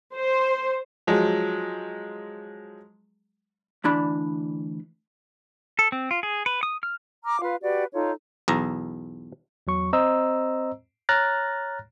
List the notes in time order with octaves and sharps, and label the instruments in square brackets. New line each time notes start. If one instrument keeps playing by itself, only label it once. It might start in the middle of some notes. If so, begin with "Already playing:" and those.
[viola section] C5
[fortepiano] F3 F#3 G#3
[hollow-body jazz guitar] D2 E3 D4 B5
[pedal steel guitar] A4
C4
F4
G#4
B4
D#6
F6
[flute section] A#5 D6 F6
F4 B4 F5
F#4 G4 B4 D5
D#4 F4 A4 C#5
[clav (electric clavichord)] B1 E2 A#5
[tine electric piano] E2 F#3 C#6
C4 C5 D#5 A#5 E6
C#5 A#5 F6 F#6 A6 A#6